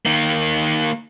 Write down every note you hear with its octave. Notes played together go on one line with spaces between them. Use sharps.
D#3 A#3